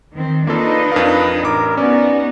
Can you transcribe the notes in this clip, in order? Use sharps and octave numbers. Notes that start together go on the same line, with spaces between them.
D#3 C4
A#3 D4 D#4 F4 A4 B4 D#5
F2 A#4 F5
A1 A#4 D6
B3 C#4 D#4 F#4 D5